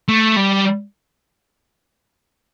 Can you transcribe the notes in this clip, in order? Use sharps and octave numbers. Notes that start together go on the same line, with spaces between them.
A3
G3